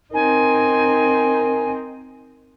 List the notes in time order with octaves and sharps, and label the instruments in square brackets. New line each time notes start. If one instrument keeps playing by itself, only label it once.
[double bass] C4 D#4 [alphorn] A#4 [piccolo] G#5